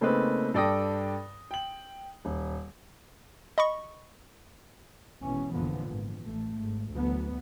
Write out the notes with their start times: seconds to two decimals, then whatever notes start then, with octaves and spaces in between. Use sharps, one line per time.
0.01 C#3 A3 A#3 C4 D#4 B4
0.54 G2 A4 D5 G5 D#6 A#6
1.51 G5 F#7
2.25 D#1
3.58 D#5 B5 C#6
5.22 G#1 B2 E3 C#4
5.53 F1 A#2 D3 E3 F3 B3
5.87 G#1
6.21 A1 A3
6.58 G#1
6.92 D2 E3 F#3 B3